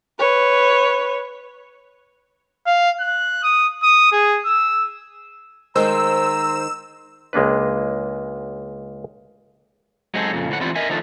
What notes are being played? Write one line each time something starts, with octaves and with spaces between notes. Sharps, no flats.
B4 C#5
F5
F#6
D#6
D#6
G#4
E6
D#3 G#3 C5 A#5 E6
C#2 G#3 A#3 D4 B4
F#3 G#3 C4 D#4 G#4 A4
F2 A#2 C#3
D2 A2 F#5
E3 G3 B3 C4 E4 F4
A#4 D#5 E5 G#5
D#3 F3 A3 D4